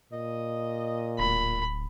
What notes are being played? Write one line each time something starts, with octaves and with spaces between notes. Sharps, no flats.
A#2 D#5
D1 B5